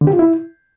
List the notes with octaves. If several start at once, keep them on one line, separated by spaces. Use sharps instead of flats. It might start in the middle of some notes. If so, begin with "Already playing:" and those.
D3
G4
F4
E4